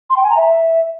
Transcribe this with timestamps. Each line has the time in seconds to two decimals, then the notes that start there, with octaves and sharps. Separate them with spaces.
0.10 C6
0.17 G5
0.23 G#5
0.30 A#5
0.37 E5